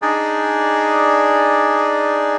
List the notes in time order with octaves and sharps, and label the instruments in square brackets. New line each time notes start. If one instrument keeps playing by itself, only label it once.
[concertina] D4 D#4 G#4 D5